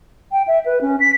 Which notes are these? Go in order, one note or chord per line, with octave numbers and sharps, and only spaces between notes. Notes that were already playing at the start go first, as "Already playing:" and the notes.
G5
E5
B4
C#4
B6